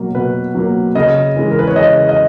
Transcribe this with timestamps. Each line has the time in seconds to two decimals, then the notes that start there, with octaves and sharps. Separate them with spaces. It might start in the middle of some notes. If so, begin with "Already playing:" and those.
Already playing: B2 F#3 A#3
0.15 B2 B4
0.55 F#3 A#3
0.95 C#3 D#5
1.36 E3 G#3
1.51 A#4
1.59 B4
1.67 C#5
1.76 C#3 D#5
2.09 D#5